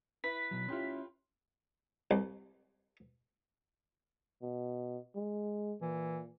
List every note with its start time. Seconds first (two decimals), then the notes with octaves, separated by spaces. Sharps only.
0.24 E4 B4 B6
0.51 B2 F#3
0.68 C#4 E4 F4 G4 C6
2.11 C2
4.42 B2
5.15 G#3
5.81 A#2 E3